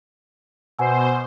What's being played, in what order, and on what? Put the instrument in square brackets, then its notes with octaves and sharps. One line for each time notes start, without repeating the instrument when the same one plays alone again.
[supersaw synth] B2 C5 [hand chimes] F#5 G#5 E6